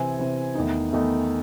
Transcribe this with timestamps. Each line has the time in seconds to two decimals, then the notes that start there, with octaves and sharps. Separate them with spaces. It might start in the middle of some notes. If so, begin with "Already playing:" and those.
Already playing: C3 E3 C4 G#5
0.19 C3 E3 C4
0.55 E2 D#3 A3 D#4
0.93 E2 D#3 A3 D#4